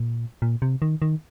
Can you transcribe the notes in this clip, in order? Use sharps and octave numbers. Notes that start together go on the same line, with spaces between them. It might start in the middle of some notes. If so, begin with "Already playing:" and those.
Already playing: A#2
A#2
C3
D#3
D#3